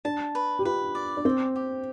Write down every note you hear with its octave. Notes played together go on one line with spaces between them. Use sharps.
D4 A5
B4
G4
F4 B4
D5
D4
C4 G5
G4